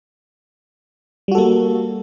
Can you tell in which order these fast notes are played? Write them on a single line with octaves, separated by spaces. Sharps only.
G3 F#4 A4 A#3